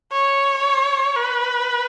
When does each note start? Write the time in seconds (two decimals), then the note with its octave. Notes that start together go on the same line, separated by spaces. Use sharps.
0.12 C#5
1.17 B4